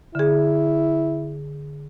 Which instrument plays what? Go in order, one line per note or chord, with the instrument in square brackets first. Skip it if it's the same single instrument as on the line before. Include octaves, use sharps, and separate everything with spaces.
[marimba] D3 G#4 [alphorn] E4